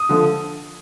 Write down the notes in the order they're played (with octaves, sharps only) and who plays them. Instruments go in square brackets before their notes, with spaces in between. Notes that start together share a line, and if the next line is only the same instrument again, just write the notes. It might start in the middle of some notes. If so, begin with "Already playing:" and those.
Already playing: [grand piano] D#6
D3 F3